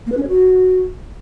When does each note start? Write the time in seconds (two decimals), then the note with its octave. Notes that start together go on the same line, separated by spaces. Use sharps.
0.06 A#3
0.12 B4
0.17 C#4
0.23 C#5
0.28 F#4